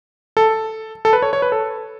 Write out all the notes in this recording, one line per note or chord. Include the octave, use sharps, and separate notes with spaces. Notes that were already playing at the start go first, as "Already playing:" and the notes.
A4
A4
B4
C#5
C#5
B4
A4